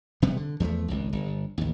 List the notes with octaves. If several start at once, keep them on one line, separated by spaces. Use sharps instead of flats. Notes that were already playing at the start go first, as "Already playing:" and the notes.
E1 C3 G3 B3
D3
E2 F3 G#3 A3
G#1 C#2
G1
A1 D#2